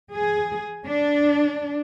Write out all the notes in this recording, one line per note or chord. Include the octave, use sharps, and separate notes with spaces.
G#4
D4